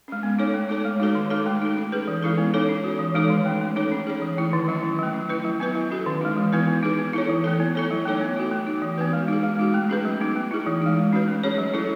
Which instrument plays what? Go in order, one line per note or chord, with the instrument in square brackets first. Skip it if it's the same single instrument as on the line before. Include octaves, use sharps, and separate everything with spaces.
[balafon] G#3 C#4
B3
D#4 A4 C#5
A3
D#4 A4 C#5
G#3
D#4 F#4 A4 C#5
D#3
G#3 D#4 A4
A3
D#4 A4
C#4
G#4 B4
E3
G#3 C#4 E4 A4
B3
D#4 A4 C#5
C#4
F#4 C#5
E3
G#3 D#4 A4 C#5
D#3
A3 C#4
A3
D#4 A4 C#5
C#4
G#4 C#5
E3
A3 E4
D#3
F#3 C#4 E4
D#3
F#3 A3
C#4
E4 B4
F#3
B3 E4 B4
F#3
C#4 F#4 A4
D#3
G#3 D#4
E3
B3 E4 B4
B3
D#4 G#4 B4
B3
E4 A4 C#5
E3
A3 E4 A4
B3
E4 A4 C#5
F#3
A3 D#4 A4 C#5
B3
D#4 F#4
A3
D#4 F#4
E3
B3 F#4 B4
G#3
D#4 G#4
G#3
D#4 F#4
A3
C#4 G#4 B4
F#3
B3 D#4
A3
E4 G#4
E3
G#3 D#4
G#3
C#4 F#4 B4
A3
C#4 G#4 C#5
F#3
C#4 E4 A4 C#5